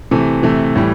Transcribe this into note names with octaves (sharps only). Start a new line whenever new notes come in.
C3 E3 A3
C3 E3 A3
A2 E3 G3